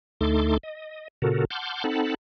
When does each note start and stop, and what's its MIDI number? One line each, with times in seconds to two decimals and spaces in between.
0.21 0.57 38
0.21 0.57 57
0.21 0.57 63
0.21 0.57 69
0.21 0.57 84
0.21 0.57 86
0.63 1.08 75
1.22 1.45 46
1.22 1.45 49
1.22 1.45 66
1.22 1.45 69
1.22 1.45 70
1.51 1.84 78
1.51 1.84 81
1.51 1.84 84
1.51 1.84 86
1.51 1.84 89
1.51 1.84 91
1.84 2.15 60
1.84 2.15 63
1.84 2.15 69
1.84 2.15 78
1.84 2.15 81
1.84 2.15 83